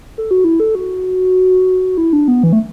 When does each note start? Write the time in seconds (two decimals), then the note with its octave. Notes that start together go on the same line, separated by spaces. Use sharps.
0.18 A4
0.31 F#4
0.44 E4
0.60 A4
0.75 F#4
1.98 E4
2.13 D4
2.28 B3
2.43 E3
2.53 A3